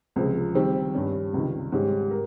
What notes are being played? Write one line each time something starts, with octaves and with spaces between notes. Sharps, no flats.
C#2 C3 F3 G#3
D#3 G3 C4 G4
G2 G3 C#4
C#2 C3 D#3
G#2 G3 C#4 G4
A#4